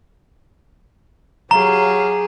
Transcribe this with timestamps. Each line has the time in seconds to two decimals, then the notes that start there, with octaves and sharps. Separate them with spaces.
1.51 F#3 G4 G#4 F5 A#5